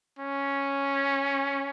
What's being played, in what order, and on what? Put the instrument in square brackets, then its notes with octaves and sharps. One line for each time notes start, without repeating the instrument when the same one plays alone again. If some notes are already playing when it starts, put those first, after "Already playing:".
[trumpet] C#4